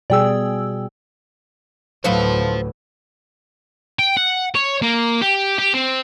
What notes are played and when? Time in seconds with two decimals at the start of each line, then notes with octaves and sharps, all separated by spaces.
0.10 B2 G3 G#4 D5 G5 E6
2.04 D2 A2 F#3 A3 B4 C5 F5
3.99 G5
4.17 F#5
4.55 C#5
4.82 A#3
5.21 G4
5.58 G4
5.74 C4